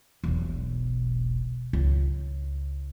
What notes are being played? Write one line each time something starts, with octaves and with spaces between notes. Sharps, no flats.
E1 B1
C#2